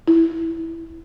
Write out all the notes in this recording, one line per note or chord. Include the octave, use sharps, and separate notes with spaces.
E4